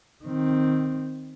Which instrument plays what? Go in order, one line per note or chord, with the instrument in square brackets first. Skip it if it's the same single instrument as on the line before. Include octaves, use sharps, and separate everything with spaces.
[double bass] D#3 C4